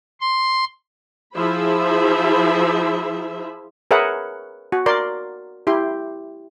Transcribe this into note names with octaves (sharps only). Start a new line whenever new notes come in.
C6
F3 E4 G#4 C5 E5 B5
G#4 A#4 B4 C#5 E5 F#5
F#4
A#4 D5 C6
E4 G4 C6